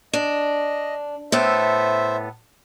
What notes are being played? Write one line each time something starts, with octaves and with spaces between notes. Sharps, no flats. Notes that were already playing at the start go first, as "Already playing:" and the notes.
D4 D#5
A2 B3 A4 C5 E5